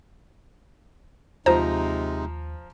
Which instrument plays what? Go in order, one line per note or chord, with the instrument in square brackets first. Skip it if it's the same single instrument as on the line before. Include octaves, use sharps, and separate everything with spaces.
[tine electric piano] D#2 [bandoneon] C3 G#3 D#4 [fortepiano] F3 A#5 [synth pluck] C5